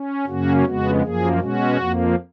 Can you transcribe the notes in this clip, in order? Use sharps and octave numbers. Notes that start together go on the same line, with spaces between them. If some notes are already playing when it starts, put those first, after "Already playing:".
Already playing: C#4
F#2 C#3 F#3 A#3 C#4 F#4
F2 C#3 G#3 B3 F#4
F#2 F3 A#3 G#4
B2 G#3 C#4 F#4
F2 F3 A#3